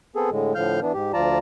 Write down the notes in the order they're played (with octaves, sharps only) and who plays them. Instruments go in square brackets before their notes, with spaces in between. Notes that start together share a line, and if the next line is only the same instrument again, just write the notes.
[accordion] B3 C4 G#4 A4
A2 D3 G#3
A2 D3 F3 F5 F6 G6
E3 B3 D4
G#2 G4
D2 F3 F4 D5 A5 A#5